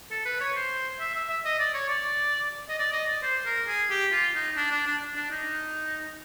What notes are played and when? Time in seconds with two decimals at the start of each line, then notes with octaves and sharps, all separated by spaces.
0.11 A4
0.25 B4
0.40 C#5
0.56 C5
1.00 E5
1.15 E5
1.29 E5
1.45 D#5
1.59 D5
1.74 C#5
1.89 D5
2.69 D#5
2.79 D5
2.93 D#5
3.08 D5
3.23 C5
3.46 A#4
3.67 G#4
3.90 G4
4.12 F4
4.35 D#4
4.57 D4
4.71 D4
4.86 D4
5.16 D4
5.31 D#4